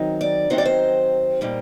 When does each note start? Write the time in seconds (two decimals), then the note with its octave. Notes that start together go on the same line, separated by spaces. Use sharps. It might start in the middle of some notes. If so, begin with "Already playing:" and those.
Already playing: D#3 F#3 C4 D#4
0.21 D5
0.50 D#3 F#3 C4 D#4 C5
0.58 D5
0.65 C5
1.41 A#2 G3 A#3 D#4